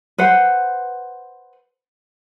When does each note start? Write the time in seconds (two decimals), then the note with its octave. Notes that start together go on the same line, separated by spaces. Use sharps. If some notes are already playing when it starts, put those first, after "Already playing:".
0.18 B4 C5 F#5